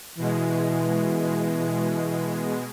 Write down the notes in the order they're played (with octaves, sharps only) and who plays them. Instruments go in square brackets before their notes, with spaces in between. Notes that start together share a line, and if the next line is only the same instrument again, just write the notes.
[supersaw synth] B2 G#3 [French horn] E3